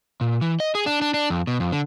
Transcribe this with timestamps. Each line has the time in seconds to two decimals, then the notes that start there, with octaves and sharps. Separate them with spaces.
0.21 A#2
0.41 E3
0.60 D#5
0.75 G#4
0.86 D4
1.02 D4
1.14 D4
1.30 F2
1.47 B2
1.60 F2
1.72 D3